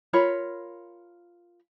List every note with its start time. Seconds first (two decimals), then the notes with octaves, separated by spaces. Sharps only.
0.13 F4 A#4 C#5 B5